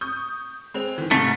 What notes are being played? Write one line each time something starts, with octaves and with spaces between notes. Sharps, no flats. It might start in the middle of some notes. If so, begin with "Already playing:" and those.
C#6 D#6 G6
G#3 C4 F7
D#3 E3
G#2 C3 A3